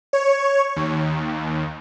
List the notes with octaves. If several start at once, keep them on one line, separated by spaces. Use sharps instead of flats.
C#5
D#2